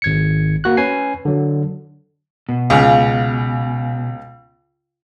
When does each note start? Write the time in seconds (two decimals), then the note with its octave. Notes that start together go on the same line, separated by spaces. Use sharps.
0.02 G#1 G#6 C#7
0.64 A#3 F#4 F#6
0.77 C#4 B4 G#5 C7
1.25 D3 F#3
2.49 B2
2.70 C#2 C#3